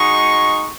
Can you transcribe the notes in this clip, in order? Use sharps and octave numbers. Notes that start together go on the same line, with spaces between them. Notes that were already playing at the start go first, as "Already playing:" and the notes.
Already playing: G#3 D#4 F#4 C#6